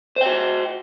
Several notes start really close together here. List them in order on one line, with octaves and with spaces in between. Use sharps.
C5 G5 F#4